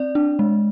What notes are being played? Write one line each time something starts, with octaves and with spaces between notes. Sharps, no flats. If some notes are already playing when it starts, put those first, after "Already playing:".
Already playing: C4 D5
D4
G#3